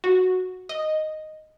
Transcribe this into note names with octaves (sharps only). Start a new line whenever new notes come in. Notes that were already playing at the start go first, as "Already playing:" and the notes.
F#4
D#5